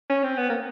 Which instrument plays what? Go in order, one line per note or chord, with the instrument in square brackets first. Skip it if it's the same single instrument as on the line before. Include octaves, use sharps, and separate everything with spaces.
[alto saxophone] C#4
C4
B3
A#3